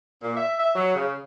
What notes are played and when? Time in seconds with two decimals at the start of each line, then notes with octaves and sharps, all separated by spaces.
0.23 A#2
0.36 E5
0.60 E5
0.76 F#3
0.95 C#3